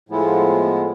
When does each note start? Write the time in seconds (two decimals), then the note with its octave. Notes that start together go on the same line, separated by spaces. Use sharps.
0.09 A2 F3 G#3 B3 E4